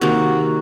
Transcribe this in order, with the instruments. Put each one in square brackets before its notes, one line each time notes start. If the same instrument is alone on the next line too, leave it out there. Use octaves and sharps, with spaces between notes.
[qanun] C3 D#3 A#3 [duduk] F#4